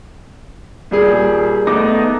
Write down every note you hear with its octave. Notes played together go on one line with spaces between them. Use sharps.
D#1 G3 G#4
A3 B3 D#4 D6